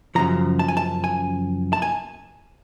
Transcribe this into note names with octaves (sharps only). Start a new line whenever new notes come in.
F#2 C#3 F3 A#5
A5
G#5
A5
G#5
A5
G#5